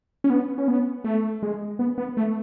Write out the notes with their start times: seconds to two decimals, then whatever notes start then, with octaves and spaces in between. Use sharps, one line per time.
0.24 C#4
0.30 B3
0.58 C#4
0.68 B3
1.04 A3
1.43 G#3
1.79 B3
1.98 B3
2.17 A3